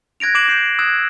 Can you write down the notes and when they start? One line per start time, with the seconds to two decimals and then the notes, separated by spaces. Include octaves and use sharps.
0.20 F#6 G#6 A#6 D7 F7
0.35 D6 C7 D7 E7 F#7
0.48 G6 C7 E7
0.79 D#6 E6 F#6 G#6 E7